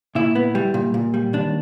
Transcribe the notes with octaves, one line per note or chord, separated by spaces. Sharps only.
A#2 E4
B3
G3
A#2
A#2
G3
D#2 D4